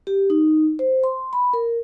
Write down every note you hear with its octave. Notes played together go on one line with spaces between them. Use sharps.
G4
D#4
C5
C6
B5
A#4